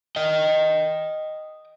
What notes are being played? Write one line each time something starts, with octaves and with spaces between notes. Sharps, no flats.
D#5 G5